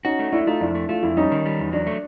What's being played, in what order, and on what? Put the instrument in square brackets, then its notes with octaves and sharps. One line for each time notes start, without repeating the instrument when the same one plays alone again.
[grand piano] C#4 D#4 [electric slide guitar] F#4
[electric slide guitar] A3
[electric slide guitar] A3 [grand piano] D4 E4
[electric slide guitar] A3 [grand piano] D#4 F4
[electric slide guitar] F2 [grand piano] D4 E4
[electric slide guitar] A3
[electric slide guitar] A3 [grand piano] F4
[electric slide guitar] F2 [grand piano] E4
[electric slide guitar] G3 [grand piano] C#4 D#4
[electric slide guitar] D#3
G3
E2
[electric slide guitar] F#3 [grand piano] D4
[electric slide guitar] A3